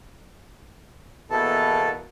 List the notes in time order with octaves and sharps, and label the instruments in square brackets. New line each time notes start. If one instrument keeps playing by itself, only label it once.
[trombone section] E2 B2 A#3 [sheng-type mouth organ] E4 A4 A5